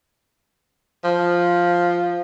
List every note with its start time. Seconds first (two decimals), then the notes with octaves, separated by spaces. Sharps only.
1.04 F3